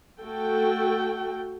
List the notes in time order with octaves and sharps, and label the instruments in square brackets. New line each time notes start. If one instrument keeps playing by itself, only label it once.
[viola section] A3 F#4 A4 G5